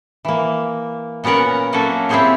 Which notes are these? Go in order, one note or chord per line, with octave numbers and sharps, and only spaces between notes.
E3 A#3
A#2 B3 C#4 A#4 F#5
F#3 A#3 C#4 F#4 A4 E5
C4 E4 G4 G#4 C5 C#5